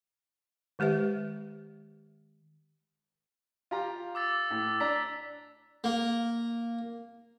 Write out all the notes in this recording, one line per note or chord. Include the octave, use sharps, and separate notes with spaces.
D#3 G#3 G4 B4 E5
F4 G4 A#5
D6 E6 A6
A2
D4 A#5 B6
A#3